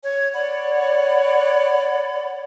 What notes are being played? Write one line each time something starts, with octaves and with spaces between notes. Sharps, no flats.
C#5 G#6
C#5 D5 F#5 B5